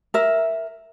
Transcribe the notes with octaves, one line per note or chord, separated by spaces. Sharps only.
A#4 E5